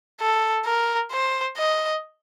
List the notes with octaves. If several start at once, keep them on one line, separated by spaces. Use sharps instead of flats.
A4
A#4
C5
D#5